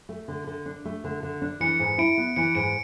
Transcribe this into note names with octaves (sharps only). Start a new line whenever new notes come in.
A3
D3
D3
D4
A3
D3
D3
D4
E3 C#7
G#2
E4 D7
B3
E3 C#7
G#2 D7